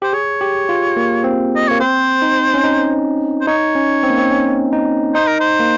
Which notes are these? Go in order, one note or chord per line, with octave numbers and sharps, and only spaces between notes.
G4 C5
G#4 C#5
G4
F4
A#3
C4
D#5
A#3 C#5
C4 C5
D#4
C#4
D#4
C5
D#4 C#5
C#4
C4
A#3
C4
C#4
D#4
D#4 C5
A#4
C5
A#3